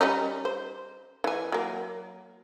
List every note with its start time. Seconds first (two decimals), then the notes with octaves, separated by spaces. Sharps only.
0.01 G3 C#4 D#4
0.45 C5
1.24 E3 G#5
1.52 F#3 A#3